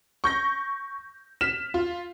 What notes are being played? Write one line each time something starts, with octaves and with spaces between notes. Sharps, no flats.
C#6 G6 A#6
F6 B6 E7
F4